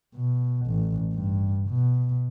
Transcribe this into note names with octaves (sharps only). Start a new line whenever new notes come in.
B2
A1
G2
B2